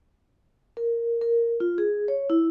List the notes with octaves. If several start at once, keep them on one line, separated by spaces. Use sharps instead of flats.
A#4
A#4
F4
G#4
C#5
E4